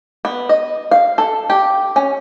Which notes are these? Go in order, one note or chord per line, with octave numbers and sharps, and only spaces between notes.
B3
D#5
F5
A4
G4
C#4